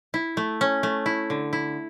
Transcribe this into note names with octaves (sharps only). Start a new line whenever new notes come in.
E4
A3
C#4
A3
E4
D3
E4